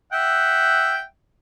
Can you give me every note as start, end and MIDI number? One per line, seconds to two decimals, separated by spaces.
0.13 1.03 76
0.13 1.03 78
0.13 1.03 79